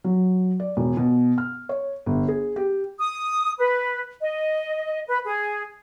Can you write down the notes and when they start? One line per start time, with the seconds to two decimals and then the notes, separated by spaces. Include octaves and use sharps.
0.04 F#3
0.60 D5
0.77 E1
0.97 B2
1.38 F6
1.69 C#5
2.06 G1
2.28 G#4
2.56 G4
2.99 D#6
3.58 B4
4.21 D#5
5.07 B4
5.25 G#4